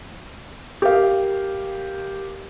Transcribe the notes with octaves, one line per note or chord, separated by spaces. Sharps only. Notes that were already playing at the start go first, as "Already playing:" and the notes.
G4 A#4 F5